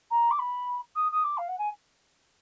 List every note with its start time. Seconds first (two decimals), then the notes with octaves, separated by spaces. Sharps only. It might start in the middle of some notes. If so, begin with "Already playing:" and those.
0.10 A#5
0.30 D6
0.38 B5
0.95 D#6
1.11 D#6
1.23 D6
1.37 F5
1.48 F#5
1.58 G#5